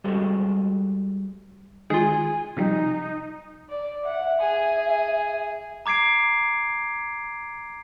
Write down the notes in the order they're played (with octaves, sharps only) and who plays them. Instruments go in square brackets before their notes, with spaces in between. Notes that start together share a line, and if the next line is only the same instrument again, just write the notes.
[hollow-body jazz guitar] G3 G#3 F#4 A4 C5
[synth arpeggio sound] D#3 G#3 [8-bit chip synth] F4 G#4 [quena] G#5
[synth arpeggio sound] C3 F3 G3 [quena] D#4
[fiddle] D5
[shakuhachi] E5 [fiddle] F#5
[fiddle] G#4 G#5
[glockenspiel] A#5 D6 G#6 C7 D7